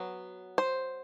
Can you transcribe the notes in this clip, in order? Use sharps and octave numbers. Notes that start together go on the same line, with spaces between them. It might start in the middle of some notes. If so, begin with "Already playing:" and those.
Already playing: F#3 B3
C5